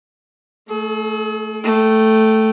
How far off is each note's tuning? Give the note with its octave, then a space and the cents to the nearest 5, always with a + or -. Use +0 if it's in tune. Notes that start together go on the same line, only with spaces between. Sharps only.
A3 +0 G#4 +45
A3 +0 G5 -20